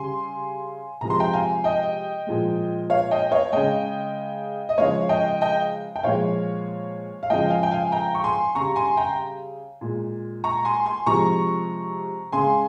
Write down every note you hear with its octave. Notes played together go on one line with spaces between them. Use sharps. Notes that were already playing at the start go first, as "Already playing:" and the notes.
Already playing: C#3 G3 G#5 C6
C3 F3 G#3 A#5
C6
G5 A#5
F5 G#5
D#5 G5
A#2 F3 G#3
C#5 F5
D#5 G5
C#5 F5
C#3 G#3 D#5 G5
D#5
C#3 F3 G#3 C#5 F5
D#5 G5
D#5 G5
G5
A#2 F3 G#3 C#5 F5
F5
C#3 F3 G#3 D#5 G5
F5 G#5
G5
F5 G#5
G5 A#5
C#6
G#5 C6
C#3 G3 A#5 C#6
G#5 C6
G5 A#5
A#2 G#3
A#5 C#6
G#5 C6
G#5 C6
C3 F3 G#3 A#5 C#6
C#3 G#3 G#5 C6